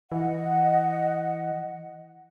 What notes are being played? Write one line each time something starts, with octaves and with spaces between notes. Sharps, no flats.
E3 D#5 F#5